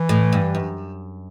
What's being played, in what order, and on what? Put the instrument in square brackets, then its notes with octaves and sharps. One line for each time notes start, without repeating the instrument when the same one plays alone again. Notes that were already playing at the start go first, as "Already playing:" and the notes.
Already playing: [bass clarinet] E3
[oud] A2
G2
F#2